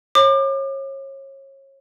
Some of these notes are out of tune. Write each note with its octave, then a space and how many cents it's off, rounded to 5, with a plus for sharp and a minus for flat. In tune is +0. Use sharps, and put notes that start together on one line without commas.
C#5 -30 D6 +35